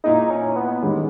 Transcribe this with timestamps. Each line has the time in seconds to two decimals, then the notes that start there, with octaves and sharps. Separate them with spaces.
0.04 A#2 A#3 D#4 E4 G#4
0.30 C#4
0.56 B3
0.82 D#3 G3 G#3 C#4 G4